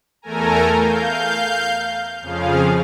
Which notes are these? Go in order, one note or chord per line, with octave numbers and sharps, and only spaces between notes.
E2 A3 A4 A#4 G#5 A#5
F5 G6
F2 C#3 F3 G#4 F5